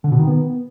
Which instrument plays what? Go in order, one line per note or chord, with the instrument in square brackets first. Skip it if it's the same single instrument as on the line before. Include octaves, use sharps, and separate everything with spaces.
[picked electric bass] D3
B2
D#3
B3